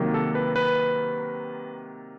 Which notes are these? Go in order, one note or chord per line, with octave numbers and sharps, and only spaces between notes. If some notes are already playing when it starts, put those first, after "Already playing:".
Already playing: C3 D#3 F#3 A#3
A4
B4
B4